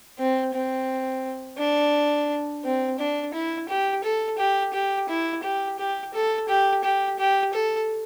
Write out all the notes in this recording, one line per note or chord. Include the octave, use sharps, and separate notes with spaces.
C4
C4
D4
C4
D4
E4
G4
A4
G4
G4
E4
G4
G4
A4
G4
G4
G4
A4